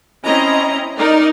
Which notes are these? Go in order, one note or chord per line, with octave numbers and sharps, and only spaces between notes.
C4 C#4 E4 D#5 A#5
D#4 A#4 D5